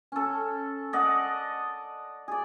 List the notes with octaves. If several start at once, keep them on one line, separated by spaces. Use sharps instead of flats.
C#4 A4
D5 D#5 F#5
G#4 D5